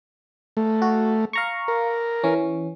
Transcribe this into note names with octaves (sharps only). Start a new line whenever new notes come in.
A3
F#4
F5 A#5 C#6
A#4
E3 C#4